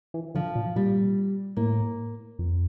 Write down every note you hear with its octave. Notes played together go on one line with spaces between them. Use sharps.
E3
D3 F3
A#2
A#2 G3
A2 A#3
F2